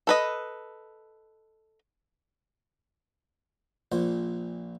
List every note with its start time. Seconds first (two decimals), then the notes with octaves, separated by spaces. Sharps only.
0.07 A4 B4 D#5
3.92 A#1 A#2 C5